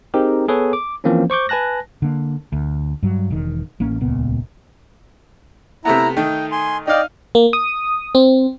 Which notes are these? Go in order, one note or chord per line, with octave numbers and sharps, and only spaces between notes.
C4 D#4 G4 G#4 A#4
B3 G#4 A4 B4 C#5
D6
E3 F3 A#3 C4 C#4
C5 C#6 D6 G6
B4 G#5 A5 F#6 A#6
D3 A#3
D2
G2 F#3
E1 D#3
A1 A#3 C#4
D#1 C#2 A#2 B3
C3 A3 B3 E4 A#5
D#3 A3 D#4 G5
G#5 C6
D#4 D5 D#5 F5 G5
A#3
D#6
C4